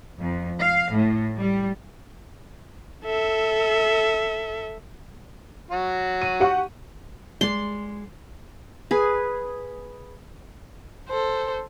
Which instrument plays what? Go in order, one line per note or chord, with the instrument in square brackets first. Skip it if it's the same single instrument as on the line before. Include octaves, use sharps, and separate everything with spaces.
[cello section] F2
F5
A2
G3
[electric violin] A4 E5
[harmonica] F#3 F#4
[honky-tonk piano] D#7
G4 F#5 C#6
[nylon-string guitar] G#3 D5 [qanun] C6
[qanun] G#4 B4
[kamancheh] A4 C5